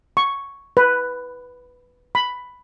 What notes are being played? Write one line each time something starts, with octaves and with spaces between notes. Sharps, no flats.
C#6
B4
B5